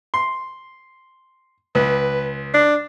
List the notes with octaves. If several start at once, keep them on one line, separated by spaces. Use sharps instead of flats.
C6
C#2 B4
D4